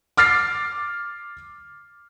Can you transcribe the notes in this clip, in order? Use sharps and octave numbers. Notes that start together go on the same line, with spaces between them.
D6 F6 A6 C7